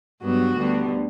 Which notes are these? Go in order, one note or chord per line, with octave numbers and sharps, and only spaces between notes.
G2 F#3 B3 F#4
D2 D3 G3 B3